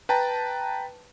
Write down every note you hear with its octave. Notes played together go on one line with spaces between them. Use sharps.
B4 G5 A5 A#5